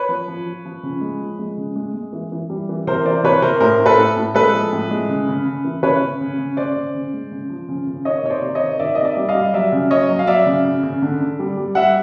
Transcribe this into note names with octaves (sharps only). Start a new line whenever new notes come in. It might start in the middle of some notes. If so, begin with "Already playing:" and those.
Already playing: B4 C#5
F3
F3
F3
F3
C#3
G#3
F3
G#3
C#3
G#3
G#3
E3
E3
G3
E3
C3 A#4 C5
E3 C5 D5
C3 B4 C#5
C3 A#4 C5
A2 A#4 C5
A2
A4 B4
A2
A2
G#3 A4 B4
F3
A2
G#3
C#3
C#3
C#3
E3
C#3 B4 C#5
C#3
C#3
C#3
C#3 C5 D5
C#3
C#3
G#3
C#3
F3
C#3
C#3
D#3 C#5 D#5
C3 C#5
C5 D5
C3
C#5 D#5
D#3
D#3 D5 E5
C3 D#5
D5 E5
G3
D#5 F5
G3
F#3 D5 E5
C#3
F#3 C#5 D#5
F#3
F5
F#3 D5 E5
C#3
C#3
C#3
D3
D3
G3
G3
G3 E5 F#5